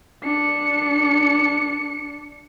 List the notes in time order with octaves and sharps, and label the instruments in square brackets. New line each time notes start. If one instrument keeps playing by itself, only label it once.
[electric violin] D4 C#7